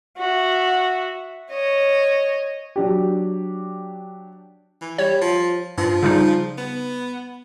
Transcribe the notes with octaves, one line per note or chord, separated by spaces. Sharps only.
F#4 E5
C#5 D#5
F#3 D4 G4
E3
G3 C#5
F3
G2 F3
C#3 G3 D#4
B3